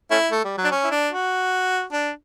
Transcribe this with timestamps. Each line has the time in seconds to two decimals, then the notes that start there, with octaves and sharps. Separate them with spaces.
0.11 A3 C#4 E4
0.31 A3
0.45 G3
0.58 F#3
0.64 D4
0.71 C#4
0.84 E4
0.91 D4
1.11 F#4
1.93 D4